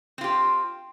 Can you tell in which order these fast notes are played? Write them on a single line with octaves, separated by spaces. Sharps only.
C4 F4 G4